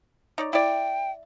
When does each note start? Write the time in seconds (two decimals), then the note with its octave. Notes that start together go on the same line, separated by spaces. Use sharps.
0.38 D#4 C#5 D5
0.53 E4 D5 G5